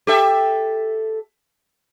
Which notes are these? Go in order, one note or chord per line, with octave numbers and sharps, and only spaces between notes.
G4 A4 E5